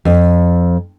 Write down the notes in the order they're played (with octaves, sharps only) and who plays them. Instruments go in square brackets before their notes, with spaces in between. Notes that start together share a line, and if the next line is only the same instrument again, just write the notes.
[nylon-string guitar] F2